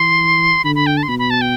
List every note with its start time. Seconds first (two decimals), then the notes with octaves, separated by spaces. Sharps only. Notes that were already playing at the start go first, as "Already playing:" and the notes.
Already playing: E3 C6
0.64 D3 B5
0.75 B5
0.87 G5
0.97 A5
1.03 C6
1.09 B2 B5
1.19 B5
1.30 A5
1.41 G5